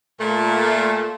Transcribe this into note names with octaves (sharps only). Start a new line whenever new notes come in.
A#2 A3